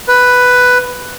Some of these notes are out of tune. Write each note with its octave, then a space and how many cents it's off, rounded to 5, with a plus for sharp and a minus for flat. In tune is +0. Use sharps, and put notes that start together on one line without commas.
B4 +5